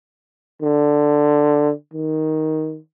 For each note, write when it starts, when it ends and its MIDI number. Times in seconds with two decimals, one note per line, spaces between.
0.62 1.72 50
1.94 2.78 51